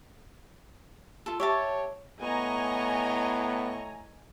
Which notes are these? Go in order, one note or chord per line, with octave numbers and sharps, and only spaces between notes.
F4 A4
G4 C#5 E5 A5
A2 B3 D#5 G#5 A#5 C#6